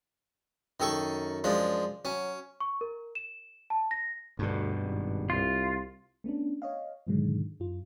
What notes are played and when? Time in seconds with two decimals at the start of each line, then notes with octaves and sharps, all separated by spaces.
0.80 F#2 D#3 A4 C#6
1.44 F3 G#3 D4
2.05 F#3 C#4
2.60 C#6
2.81 A#4
3.15 E7
3.70 A5
3.91 A#6
4.39 D2 G2 B2
4.80 G#1
5.30 C2 F4
6.24 A3 B3 C#4 D4
6.62 C#5 D#5 F5
7.07 G#2 B2 D3 D#3 F#3 G#3
7.60 F#2 F4